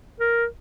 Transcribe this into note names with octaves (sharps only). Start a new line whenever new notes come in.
A#4